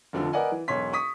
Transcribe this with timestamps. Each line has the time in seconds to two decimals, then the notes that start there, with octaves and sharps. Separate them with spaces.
0.13 F1 D3 F3
0.33 A#4 B4 D5 D#5 F#5 G#5
0.51 E3
0.68 E1 B1 C#5 C6 B6
0.93 C#6 D#6 B6